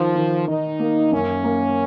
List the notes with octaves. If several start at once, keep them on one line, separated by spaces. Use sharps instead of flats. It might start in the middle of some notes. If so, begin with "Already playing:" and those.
Already playing: D#3 F3
D#3
D#3 D#4
A#3
F#2 C#4
A#3